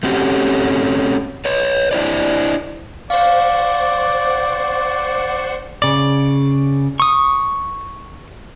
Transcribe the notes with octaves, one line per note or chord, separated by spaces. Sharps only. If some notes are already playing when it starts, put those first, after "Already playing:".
A3 C4 C#4 F#4 G4 A4
B4 C#5
D4 E4 C5 D5
C5 D5 F5 F#5 C#6
C#3 D5
C#6 D#6